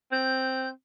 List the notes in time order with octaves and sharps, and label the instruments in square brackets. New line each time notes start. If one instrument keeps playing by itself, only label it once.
[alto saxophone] C4 [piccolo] G6